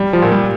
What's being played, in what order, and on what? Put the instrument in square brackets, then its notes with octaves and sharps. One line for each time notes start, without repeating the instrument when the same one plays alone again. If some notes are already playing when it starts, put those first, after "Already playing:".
Already playing: [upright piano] G3
[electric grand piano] F3
[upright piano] A#2
[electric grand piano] G3